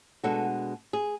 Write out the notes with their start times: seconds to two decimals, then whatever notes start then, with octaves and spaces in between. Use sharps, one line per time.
0.24 B2 G#3 D4 F#4 A4
0.93 G#4